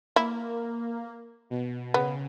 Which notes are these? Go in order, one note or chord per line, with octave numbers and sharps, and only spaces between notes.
A#3 E4
B2
C#3 B3